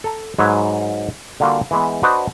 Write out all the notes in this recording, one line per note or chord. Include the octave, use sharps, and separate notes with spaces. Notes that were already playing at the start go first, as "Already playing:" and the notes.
A4 A#5
G#2 F#3 B4 G#5
D3 G3 A#3 F4 F#4
E3 G#3 B3
D4 F#4 B4 C5 D#5